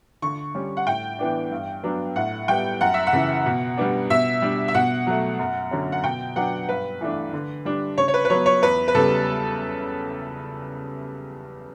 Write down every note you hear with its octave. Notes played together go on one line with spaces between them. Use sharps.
D3 C#6
G3 C#4
F#5
A2 G5
E3 B3 D4
G2
F#3 B3 D4
A2 F#5
G3 B3 G5
F#2 F#5
E5
F#5
C#3 E3
B2
G3 B3 D4
B2 E5
G3 D4
E5
B2 F#5
F#3 A3
F#2
D3 F#3 C#4
F#5
B2 G5
F#3 B3 D4 F#5
G2 B4
E3 A3 D4
D3
G3 D4
C#3 C#5
C#5
B4
B4
F#3 B3 C#5
C#5
E2 B4
B4
C#3 G3 B3 A4